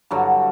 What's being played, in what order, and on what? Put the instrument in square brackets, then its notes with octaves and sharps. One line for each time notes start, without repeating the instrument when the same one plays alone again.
[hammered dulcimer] G2 D3 F#3 F#4